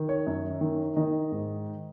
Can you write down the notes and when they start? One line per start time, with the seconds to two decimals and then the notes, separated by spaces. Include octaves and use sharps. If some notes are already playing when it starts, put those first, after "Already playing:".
Already playing: D#3
0.09 C#5
0.27 F#2
0.61 D#3
0.96 D#3 D#5
1.32 G#2